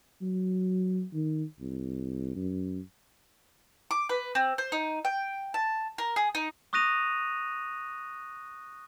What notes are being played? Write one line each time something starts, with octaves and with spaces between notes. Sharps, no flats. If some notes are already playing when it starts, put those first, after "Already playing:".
F#3
D#3
C2
F#2
D6
B4
C4
C5
D#4
G5
A5
A#4
G#4
D#4
C#6 D#6 F#6 A#6 D#7 F7